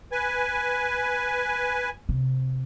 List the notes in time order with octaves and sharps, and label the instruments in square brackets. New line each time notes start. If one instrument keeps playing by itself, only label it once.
[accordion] B4 G#5
[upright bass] C3